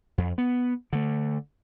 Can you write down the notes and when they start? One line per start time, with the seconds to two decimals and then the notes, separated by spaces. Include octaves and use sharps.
0.18 F2
0.38 B3
0.93 D3 A3